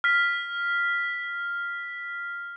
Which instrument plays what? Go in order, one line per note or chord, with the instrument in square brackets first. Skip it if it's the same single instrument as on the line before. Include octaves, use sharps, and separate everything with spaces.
[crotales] F6 B6